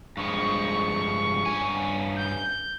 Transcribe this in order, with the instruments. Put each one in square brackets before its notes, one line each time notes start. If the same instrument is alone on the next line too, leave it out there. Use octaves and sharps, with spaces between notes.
[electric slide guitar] G2 F3 G#3 [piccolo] C#6
[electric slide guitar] G2 C#4 G#5
[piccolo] G6